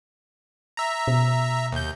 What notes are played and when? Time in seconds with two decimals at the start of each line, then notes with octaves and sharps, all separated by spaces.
0.77 E5 A#5
1.08 B2
1.72 D#2 G6